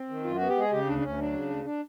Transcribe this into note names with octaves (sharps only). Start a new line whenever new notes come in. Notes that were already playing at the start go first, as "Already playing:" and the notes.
Already playing: C4
D#3
F#2 F4
F#4
B3
G4
G#3 G#4
C#3 G4
D2 D4
D4
D2 C#4
F#3 D4
C#3
D2
D4